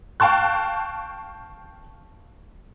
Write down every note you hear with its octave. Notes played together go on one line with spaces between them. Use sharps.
F5 G5 A5 C#6 F#6